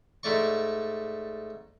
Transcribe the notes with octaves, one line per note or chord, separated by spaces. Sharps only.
G#2 A3 D5 C#6